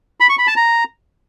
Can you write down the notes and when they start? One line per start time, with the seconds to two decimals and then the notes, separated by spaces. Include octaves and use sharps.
0.20 B5
0.29 C#6
0.38 B5
0.47 A5
0.56 A#5